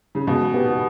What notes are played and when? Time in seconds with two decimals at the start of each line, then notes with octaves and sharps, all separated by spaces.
0.15 C#3
0.27 B2 G#3
0.54 B3 G4 B4